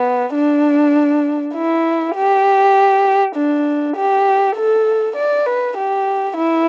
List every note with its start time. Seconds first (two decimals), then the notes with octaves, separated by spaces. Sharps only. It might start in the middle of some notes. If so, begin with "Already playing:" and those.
Already playing: B3
0.35 D4
1.55 E4
2.16 G4
3.35 D4
3.96 G4
4.56 A4
5.16 D5
5.46 B4
5.77 G4
6.36 E4